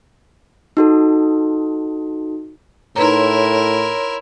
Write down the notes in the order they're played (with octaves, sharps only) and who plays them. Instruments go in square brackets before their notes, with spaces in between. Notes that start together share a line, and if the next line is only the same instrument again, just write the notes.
[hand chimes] D#4 F#4 A4
[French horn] A2 [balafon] D#4 B4 A#5 [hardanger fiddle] E4 A#4 [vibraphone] C#5 C6